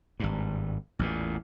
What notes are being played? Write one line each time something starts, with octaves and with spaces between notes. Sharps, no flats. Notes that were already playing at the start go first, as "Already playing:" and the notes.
G#1 G2
A1 E2 A#2